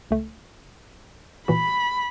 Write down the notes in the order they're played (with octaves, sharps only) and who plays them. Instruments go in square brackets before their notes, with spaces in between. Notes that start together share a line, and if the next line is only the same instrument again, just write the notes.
[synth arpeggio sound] C#2 A3
[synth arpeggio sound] A#2 E3 F#4 [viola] B5